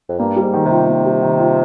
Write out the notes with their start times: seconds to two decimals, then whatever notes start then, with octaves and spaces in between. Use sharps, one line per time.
0.09 F2
0.19 G2 A#3
0.36 G3
0.42 G#2
0.54 D#3
0.65 C3
0.71 F4
0.88 A#3
1.05 G3
1.22 D#3
1.39 F4